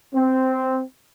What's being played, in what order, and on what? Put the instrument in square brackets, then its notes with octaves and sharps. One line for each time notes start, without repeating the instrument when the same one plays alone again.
[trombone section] C4